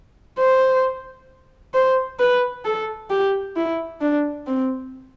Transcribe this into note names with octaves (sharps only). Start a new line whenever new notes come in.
C5
C5
B4
A4
G4
E4
D4
C4